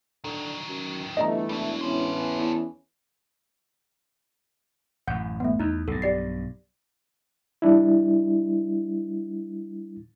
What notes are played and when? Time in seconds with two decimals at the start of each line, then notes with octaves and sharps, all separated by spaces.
0.24 D3 D#3 F#3
0.69 F#2
1.17 G1 E3 A3 D#5 A#5
1.49 E1 F#3 G3
1.81 E3 B3 C#4 A4 C5
2.37 E2
5.07 A1 F#2 F#5 G6
5.40 A3 B3
5.60 E2 D#4
5.88 B1 G2 A4
6.02 G4 D5 C7
7.62 G3 D4 E4